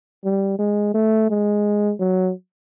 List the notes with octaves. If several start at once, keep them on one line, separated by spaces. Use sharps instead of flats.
G3
G#3
A3
G#3
F#3